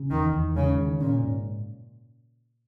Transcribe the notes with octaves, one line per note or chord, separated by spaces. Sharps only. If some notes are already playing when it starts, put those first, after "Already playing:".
Already playing: C#3
E2 D#3
E2
C#3 G#3
D#3
A#2 C#4
G#2